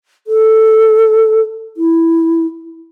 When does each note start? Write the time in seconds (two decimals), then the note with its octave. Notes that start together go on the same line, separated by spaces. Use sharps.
0.27 A4
1.77 E4